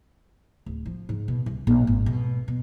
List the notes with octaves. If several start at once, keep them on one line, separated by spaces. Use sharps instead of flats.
D1
F3
G#2
B2
C2
A#1
G#1
B2
B2